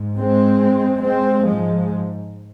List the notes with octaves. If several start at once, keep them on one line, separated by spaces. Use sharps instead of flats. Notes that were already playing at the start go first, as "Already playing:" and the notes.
Already playing: G#2
G#3 C4
G#3 C4
G#2 F3 G#3